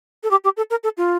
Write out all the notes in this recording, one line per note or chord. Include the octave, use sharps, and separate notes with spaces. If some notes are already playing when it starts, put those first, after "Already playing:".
A4
G4
G4
A4
A#4
A4
F4